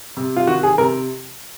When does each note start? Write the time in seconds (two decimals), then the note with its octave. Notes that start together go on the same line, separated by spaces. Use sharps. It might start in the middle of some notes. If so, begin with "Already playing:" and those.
0.17 C3
0.36 F4
0.47 D#3 F#4
0.63 G#4
0.78 C3 A#4